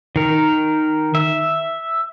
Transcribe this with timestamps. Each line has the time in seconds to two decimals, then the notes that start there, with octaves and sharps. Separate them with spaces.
0.16 D#3 A#4
1.15 E5